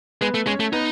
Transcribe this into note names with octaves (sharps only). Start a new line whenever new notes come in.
G#3 B3 B4
A3
G#3 C#4 C#5
A3
B3 D#4 B4